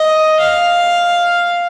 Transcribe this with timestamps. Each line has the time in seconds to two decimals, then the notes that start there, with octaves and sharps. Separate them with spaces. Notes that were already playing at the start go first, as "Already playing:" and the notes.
Already playing: D#5
0.40 F5